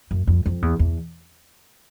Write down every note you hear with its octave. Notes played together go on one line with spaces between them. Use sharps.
F#2
F2
F2
E2
E2